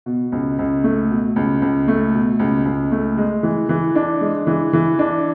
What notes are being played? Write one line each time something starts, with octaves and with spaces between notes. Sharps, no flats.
B2
C#2
C#2
A3
B2
C#2
C#2
A3
B2
C#2
C#2
A3
G#3
E3
E3
D4
G#3
E3
E3
D4